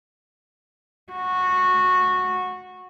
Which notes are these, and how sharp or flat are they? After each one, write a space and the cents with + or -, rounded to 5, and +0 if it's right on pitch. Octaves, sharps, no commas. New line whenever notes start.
F#4 -15